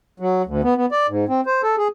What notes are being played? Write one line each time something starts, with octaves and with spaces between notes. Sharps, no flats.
F#3
D2
B3
B3
D5
G#2
C4
C5
A4
G#4